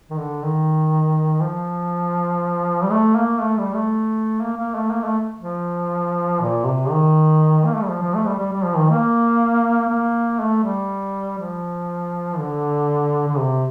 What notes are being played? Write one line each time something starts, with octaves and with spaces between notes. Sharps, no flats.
D#3
D3
D#3
F3
G3
A3
A#3
A3
G3
A3
A#3
A#3
A3
A#3
A3
F3
A#2
C3
D#3
A#3
A3
G3
F3
F3
A3
G3
G3
G3
F3
D#3
A#3
A#3
A3
G3
F3
D3
D3
C3